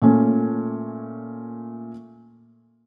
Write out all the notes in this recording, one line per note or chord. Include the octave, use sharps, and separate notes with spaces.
A#2 A3 C#4